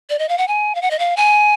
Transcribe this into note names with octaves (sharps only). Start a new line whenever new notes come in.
D5
D#5
F5
F#5
G#5
F5
F#5
D#5
F5
G#5